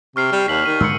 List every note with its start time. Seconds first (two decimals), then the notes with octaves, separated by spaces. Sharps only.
0.16 C3 C#6 F6 C7
0.32 G3
0.48 D#2 B6 F#7
0.66 D#3 D#7
0.81 G#2 D3 G#3 E6 C#7